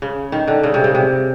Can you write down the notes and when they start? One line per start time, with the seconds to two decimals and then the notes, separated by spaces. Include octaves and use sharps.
0.02 C#3
0.32 D#3
0.48 D3
0.63 C#3
0.74 C3
0.84 C#3
0.95 C3